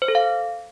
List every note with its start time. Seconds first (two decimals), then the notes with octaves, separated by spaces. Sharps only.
0.02 C5
0.08 A4
0.15 F5